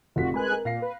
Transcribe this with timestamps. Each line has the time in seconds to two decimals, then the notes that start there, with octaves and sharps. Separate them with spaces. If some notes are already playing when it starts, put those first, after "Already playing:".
0.16 F1 F4 F#4 B6
0.34 G#3 A#4 B4 G#5 B5 F#6
0.51 A#4
0.65 A#2 F5 A#6 C7
0.82 B4